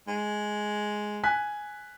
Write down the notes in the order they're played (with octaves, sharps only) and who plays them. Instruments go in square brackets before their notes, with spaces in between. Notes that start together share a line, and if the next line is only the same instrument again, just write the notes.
[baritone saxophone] G#3
[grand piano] G#5 F#6 B6